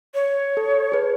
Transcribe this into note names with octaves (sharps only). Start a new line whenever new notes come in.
C#5
A4
G#4 B4